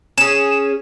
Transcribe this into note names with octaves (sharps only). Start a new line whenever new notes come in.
C#4 G#4 E7